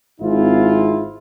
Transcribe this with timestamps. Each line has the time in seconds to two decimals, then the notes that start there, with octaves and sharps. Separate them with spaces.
0.20 G#1 G#2 C4 E4 F4